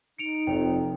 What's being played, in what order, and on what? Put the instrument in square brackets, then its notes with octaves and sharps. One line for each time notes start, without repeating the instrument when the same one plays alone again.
[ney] D#4 [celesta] C#7 D7 F7
[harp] F1 [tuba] F2 [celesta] G5